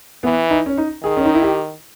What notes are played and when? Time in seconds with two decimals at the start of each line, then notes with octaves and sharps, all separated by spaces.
0.23 E3 B3
0.51 D#4
0.66 C#4
0.78 D#4
1.03 D#3 G#4
1.17 C#4
1.25 D#4
1.34 E4
1.43 G4